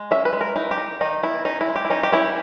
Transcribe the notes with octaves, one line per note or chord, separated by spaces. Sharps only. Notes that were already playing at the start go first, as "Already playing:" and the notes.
Already playing: G#3
C#4 E5
B4
G#3
A#4
D#4 E4
G4
D#4
D#3 D#4
B3 E4
C#4 D#4
E4
G#3
G4
E4
C#4 D#4
G4
C#4 E4